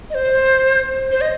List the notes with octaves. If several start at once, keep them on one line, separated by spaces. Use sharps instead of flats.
D#5
C5
C5
D#5